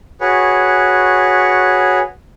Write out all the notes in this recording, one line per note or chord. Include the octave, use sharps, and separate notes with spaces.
F#4 G#4 B4 C#5